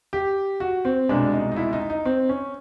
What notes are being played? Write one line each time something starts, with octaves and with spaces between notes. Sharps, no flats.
G4
F#4
C4
C2 B2 G#3 D4
D#4
D#4
E4
D#4
D#4
C4
C#4